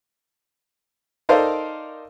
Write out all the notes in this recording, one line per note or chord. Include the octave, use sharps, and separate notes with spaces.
D#4 A4 A#4 C5 D5 F5